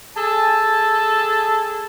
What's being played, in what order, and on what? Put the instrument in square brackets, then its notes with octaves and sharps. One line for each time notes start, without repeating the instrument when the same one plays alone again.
[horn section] G#4 A4 G#5 A5